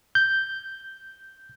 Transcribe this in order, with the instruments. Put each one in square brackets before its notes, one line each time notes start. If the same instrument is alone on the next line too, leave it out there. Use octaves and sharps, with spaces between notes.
[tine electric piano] G6